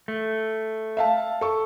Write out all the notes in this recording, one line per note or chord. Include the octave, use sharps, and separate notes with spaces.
A3
E5 F5 A5
A4 C#6